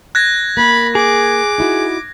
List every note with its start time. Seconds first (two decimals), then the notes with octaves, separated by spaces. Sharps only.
0.15 F#6 G#6 A#6
0.57 A#3 A#4 B5
0.95 G#4 D6
1.58 D#4 E4 F#4